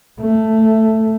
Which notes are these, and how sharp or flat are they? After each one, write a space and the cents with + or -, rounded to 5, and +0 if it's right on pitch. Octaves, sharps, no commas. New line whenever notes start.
A3 +5